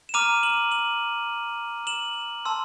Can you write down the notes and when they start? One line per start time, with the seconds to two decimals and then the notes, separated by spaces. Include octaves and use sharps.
0.09 E7
0.14 A#5 D6 F6 D#7 F7
0.43 E7 F#7
0.71 E7 F#7
1.87 E7 F#7
2.45 A5 C6 E6